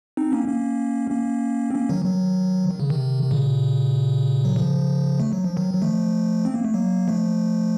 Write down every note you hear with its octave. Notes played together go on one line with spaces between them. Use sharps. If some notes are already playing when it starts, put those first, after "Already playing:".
C4 D#4
A#3 C#4
A#3 C#4
A#3 C#4
C4
A#3 C#4
D#3 F#3
D#3 F#3
D#3
C#3
C3 D#3
D#3
A#2 C#3
F#3
C#3 F3
A3
F#3
F3
D#3 F#3
F#3
F3 A3
C4
A#3
A3
F#3 A#3
F3 A3